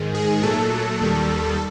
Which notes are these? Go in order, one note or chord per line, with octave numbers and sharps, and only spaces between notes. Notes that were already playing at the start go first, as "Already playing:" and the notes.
Already playing: G#2 D#3 G#3
G#4
A#2 F#3 A3 A4
D#2 D#3 G3